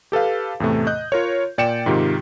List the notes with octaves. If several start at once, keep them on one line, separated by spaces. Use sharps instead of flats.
G4 A4 B4 F5
E2 A2 C3 A3
D#5 F#6 G6
F4 A#4 C#5
A#2 D5 G5 C#7 E7
G#2 C3 D#3 F4 G4